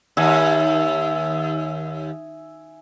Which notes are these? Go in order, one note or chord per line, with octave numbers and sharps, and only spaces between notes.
D#2 E5 G#5